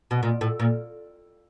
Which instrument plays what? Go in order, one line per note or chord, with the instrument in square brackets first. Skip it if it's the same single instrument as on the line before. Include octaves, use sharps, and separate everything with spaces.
[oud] B2
A#2
A2
A#2